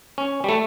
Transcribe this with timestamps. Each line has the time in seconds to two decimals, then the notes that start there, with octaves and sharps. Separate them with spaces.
0.18 C#4
0.44 G3
0.49 A3